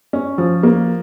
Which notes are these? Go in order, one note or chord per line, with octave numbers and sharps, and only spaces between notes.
C#4
F3
A#3